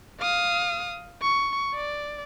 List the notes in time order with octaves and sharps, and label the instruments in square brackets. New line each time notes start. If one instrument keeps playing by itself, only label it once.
[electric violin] F5 D#6
C#6
D5